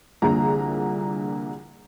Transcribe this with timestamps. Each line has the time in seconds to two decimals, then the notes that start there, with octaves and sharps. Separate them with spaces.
0.22 C2 D3 F3 A#3 G#4 A#5